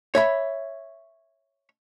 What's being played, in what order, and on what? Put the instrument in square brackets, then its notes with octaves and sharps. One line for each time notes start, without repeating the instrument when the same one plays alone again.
[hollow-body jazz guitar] C#5 E5 B5